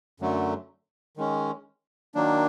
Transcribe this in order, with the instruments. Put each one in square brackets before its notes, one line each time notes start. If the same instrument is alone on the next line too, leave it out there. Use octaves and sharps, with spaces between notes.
[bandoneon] F#2 D3 F#3 A3
D#3 G#3 C#4
D#3 F#3 A#3 D4